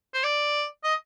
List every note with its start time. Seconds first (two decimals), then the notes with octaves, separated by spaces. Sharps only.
0.14 C5
0.23 D5
0.84 D#5